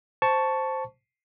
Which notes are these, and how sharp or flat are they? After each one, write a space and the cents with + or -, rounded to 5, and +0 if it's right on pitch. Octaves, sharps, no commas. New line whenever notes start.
C5 +0 A5 +0 C#6 +10